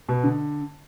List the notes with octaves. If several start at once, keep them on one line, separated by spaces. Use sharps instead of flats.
B2
D3